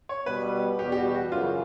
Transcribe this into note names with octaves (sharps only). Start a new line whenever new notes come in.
C#5
B2 G3 B3 B4
E2 B2 G3 G4
G4
F#4
F#4
F#2 C#3 E3 F4